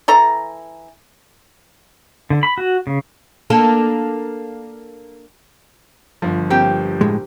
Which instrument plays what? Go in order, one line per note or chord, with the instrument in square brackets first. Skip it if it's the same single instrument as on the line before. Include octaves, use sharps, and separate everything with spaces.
[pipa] E3 A4 A#5
[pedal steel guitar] D3
B5
F#4
C#3
[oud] A#3 D4 A4
[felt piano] G1 F3
[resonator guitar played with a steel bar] A#3 C4 G4
[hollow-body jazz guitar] A2 G#3